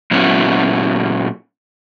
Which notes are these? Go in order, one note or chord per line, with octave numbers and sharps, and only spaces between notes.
A#2 F#3 B3 C#4 E4 F#4